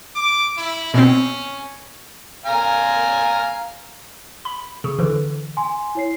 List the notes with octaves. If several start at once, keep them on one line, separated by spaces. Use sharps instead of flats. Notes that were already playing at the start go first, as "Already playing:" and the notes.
D6
E4
B2 C4 C#4
F5 G#5 A#5
B5
C#3
D3 E3
G#5 C6
E4 C#5 C7